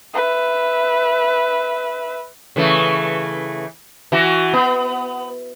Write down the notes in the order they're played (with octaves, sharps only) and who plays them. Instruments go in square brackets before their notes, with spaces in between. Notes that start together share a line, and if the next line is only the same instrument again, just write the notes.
[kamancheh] B4 E5
[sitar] C#3 E3 A3
E3 F#4
B3